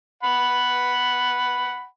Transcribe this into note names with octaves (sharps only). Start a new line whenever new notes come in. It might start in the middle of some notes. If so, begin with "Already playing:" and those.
F#5 B5